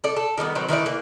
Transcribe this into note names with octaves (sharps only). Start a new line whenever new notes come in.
A4 D5
A4
D#3 G3 G#3 B3
D#3 F#3 B3 C4
D#3 E3 A3 D5
E3 A#3